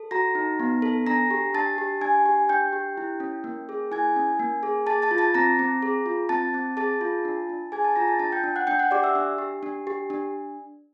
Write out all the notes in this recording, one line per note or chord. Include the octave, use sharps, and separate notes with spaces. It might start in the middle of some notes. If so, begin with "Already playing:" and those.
Already playing: A4
F#4 A#5 A#6
D#4
B3
A4
D4 A#5 A#6
G4
D4 A5 A6
G4
D4 G#5 G#6
G4
D4 G5 G6
G4
E4
C#4
A#3
G#4
E4 G#5 G#6
C#4
A#3
G#4
G#4 A5 A6
A5 A6
F4
A5 A6
C4 A#5 A#6
C4
G#4
F4
C4 A5 A6
C4
G#4 A5 A6
F4
D4
D4
G#4 G#5 G#6
A5 A6
F4 A#5 A#6
A5 A6
D4 A5 A6
G5 G6
D4
F#5 F#6
D4 G5 G6
F#5 F#6
G4 D5 D6
E5 E6
D4
G4
D4
G4
D4